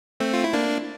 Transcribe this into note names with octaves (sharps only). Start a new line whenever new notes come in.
A3 C4
F4
E4
A#3 D4